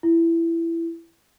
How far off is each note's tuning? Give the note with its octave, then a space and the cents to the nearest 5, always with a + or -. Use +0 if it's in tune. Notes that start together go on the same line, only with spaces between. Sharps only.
E4 +15